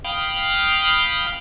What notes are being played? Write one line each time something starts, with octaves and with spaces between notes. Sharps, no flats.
F5 G5 B5 D#6 F6